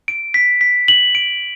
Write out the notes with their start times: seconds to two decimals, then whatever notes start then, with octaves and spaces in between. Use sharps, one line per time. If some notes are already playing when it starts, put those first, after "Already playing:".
0.08 D7
0.34 B6
0.61 B6
0.88 F#7
1.15 D7